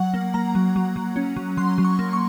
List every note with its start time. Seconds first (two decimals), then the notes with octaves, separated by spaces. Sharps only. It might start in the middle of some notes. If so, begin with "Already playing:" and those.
Already playing: F#3 F#5
0.14 A#3
0.34 A#3 A#5
0.55 F#3
0.76 F#3
0.96 F#3
1.16 C#4
1.36 F#3
1.57 F#3 C6
1.78 F#3
1.85 C#6
1.99 A#3
2.13 C#6